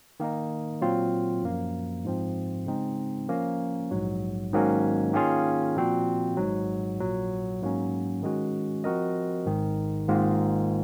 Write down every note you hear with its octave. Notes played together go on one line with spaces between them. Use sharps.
D#3 A#3 D#4
A#2 F#3 C4 F4
F#2 F3 A#3
G#2 F3 C4
C#3 G#3 C4 D#4
F3 A#3 C#4
A#1 G#2 F#3
G#2 D#3 F#3 A#3 C#4
D#3 A#3 C#4 F4 G#4
A#2 F3 C4 F#4 C5
G#1 G#2 F#3
A#1 A#2 F#3
G#2 F#3 A#3 C#4
D#3 G#3 C#4 F#4
F3 C4 F#4 A#4 D#5
G#1 G#2 D#3
G#1 G#2 D#3 A#3 F4